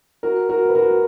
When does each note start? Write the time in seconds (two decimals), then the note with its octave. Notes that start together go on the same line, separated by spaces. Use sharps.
0.23 F#4 A#4
0.49 F#4 A#4
0.69 B4
0.75 F#4 A#4